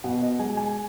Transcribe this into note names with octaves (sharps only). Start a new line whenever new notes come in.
B2 F#5
D#5
G#3 G#5
G#5